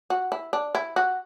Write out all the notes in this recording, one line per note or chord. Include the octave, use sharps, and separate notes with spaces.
F#4
E4
D4
E4
F#4